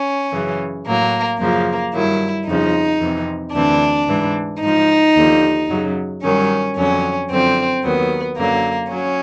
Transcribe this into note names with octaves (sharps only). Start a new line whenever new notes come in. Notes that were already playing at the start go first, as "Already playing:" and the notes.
Already playing: C#4
F#2 C#3 E3
A2 F#3 A#3
F#2 C#3 F3 A#3
G2 D#3 F#3 E4
F2 C#3 F3 D#4
F2 C3 E3
D2 C3 E3 D4
G#2 E3
G#2 F3 D#4
D#2 D3 F3
F#2 C#3 F#3
G2 D#3 F#3 C#4
F2 D3 F#3 C#4
F#2 D3 F3 C4
D#2 D#3 F#3 B3
F#2 D3 F#3 A#3
F#3 C#4